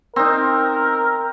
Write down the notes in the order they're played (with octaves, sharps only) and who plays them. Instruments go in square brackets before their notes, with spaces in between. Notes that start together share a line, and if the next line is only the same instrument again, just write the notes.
[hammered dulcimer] C4 D#4 [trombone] A#4